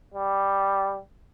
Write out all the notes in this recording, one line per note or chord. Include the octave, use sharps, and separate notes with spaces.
G3